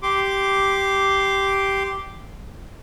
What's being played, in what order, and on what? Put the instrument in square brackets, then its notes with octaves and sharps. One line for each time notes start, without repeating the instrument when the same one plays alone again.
[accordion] G4 C6 D6